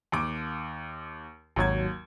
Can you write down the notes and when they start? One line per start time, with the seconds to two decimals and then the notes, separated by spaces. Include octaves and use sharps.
0.12 D#2 D6
1.56 G#1 D#2 F#3 G#6